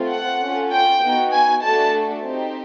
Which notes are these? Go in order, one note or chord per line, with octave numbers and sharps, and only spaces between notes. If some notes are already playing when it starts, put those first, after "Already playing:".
Already playing: A3 C4 F4 A4
F#5
C#4 F4 A4
G5
B3 D#4 F#4
G#5
A3 D4 F#4 A4 A5
C4 D#4 G4